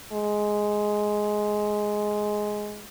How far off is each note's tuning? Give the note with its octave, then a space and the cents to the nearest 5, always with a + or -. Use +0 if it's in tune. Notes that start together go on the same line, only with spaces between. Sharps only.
G#3 +5